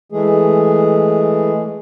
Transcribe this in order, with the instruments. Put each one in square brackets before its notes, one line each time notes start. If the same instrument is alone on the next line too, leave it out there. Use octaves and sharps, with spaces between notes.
[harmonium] E3 G#3 A3 G#4